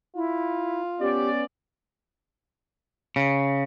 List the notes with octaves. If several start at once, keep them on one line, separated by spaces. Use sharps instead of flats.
E4 F4
B3 C#4 G4 D5
C#3